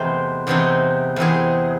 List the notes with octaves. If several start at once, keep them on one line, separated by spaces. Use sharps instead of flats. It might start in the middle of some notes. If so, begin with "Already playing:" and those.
Already playing: E2 C3 E3 A3 C4 D#4 C5
E2 C3 E3 C4 D#4
E2 C3 E3 C4 D#4 G#4